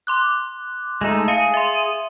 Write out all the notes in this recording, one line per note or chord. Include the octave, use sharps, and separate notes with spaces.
C6 D6 F#6
G#3 A3 D#4
G#4 F5 C#7
E5 C6